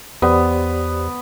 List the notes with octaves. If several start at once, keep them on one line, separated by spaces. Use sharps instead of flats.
E2 B3 G4 C5 D5